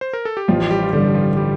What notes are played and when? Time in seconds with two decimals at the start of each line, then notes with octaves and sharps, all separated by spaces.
0.01 C5
0.13 A#4
0.25 A4
0.37 G4
0.48 A1 F3 F4
0.71 G3 G4
0.83 F4
0.93 G2 D3 G3 G4
1.14 F3 F4
1.37 G3 G4